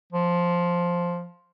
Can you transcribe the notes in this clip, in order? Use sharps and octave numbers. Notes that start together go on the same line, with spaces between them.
F3